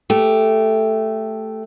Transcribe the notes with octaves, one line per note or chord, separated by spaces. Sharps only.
A3 G4